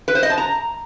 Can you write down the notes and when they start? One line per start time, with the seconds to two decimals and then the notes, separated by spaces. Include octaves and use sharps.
0.08 B4
0.15 C5
0.23 D#5
0.30 A5
0.38 A#5